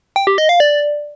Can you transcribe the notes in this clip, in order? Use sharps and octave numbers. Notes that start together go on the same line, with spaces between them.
G5
G4
D#5
F5
D5